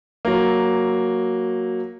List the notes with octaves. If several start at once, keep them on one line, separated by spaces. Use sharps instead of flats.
F#3 A#3